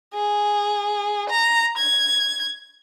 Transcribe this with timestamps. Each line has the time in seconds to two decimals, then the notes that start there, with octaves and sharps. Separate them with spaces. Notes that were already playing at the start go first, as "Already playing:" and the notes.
0.14 G#4
1.30 A#5
1.78 G#6